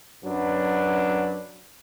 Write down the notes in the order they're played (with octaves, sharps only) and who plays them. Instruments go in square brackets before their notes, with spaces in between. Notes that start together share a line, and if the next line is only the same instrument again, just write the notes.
[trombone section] F#2 F#3 D4 B4